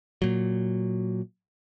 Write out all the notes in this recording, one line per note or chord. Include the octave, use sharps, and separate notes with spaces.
A#2 F#3